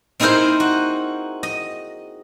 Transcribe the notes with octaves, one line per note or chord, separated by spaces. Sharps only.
C4 D#4 E4 G#4 A#4 C5
F#4
D#5